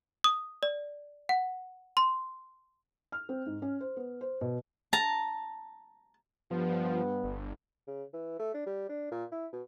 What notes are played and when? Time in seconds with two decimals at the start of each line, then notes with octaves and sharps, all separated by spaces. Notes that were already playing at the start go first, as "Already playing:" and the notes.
0.24 D#6
0.63 D5
1.29 F#5
1.97 C6
3.12 F6
3.29 C4
3.46 G#2
3.62 C#4
3.81 C5
3.97 B3
4.21 C5
4.41 B2
4.93 A5 A#5
6.51 G2 F3 B3
7.24 G1
7.87 C#3
8.13 E3
8.39 A3
8.54 D4
8.67 G3
8.89 D4
9.12 A#2
9.32 E4
9.53 B2